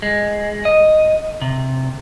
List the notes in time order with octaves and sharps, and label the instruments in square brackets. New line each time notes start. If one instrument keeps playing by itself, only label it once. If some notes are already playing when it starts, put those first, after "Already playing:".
[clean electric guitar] G#3
D#5
C3